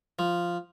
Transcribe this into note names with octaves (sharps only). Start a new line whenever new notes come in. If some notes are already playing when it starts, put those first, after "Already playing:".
F3